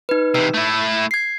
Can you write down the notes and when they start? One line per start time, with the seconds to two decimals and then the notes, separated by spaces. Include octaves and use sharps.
0.09 D#4 B4
0.35 C3 E3 E6
0.54 A3 E4
1.11 G#6 C7